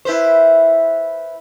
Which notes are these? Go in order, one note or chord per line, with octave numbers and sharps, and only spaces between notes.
E4 B4 C5